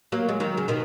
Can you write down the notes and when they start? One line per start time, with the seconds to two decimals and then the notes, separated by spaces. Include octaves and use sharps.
0.12 F#3 A#3
0.29 G#3
0.40 D#3 F#3
0.57 C#3
0.68 B2 D#3